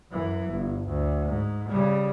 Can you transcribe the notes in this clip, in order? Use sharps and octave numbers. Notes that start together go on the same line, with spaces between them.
F#2 E3
G1
D2
G#2
C#3 G3